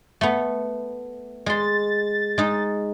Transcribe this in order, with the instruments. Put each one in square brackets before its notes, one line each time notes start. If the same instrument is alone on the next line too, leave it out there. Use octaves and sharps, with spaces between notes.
[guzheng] A3 B3
[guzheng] G#3 C6 [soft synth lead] A6
[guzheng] G#3 D#4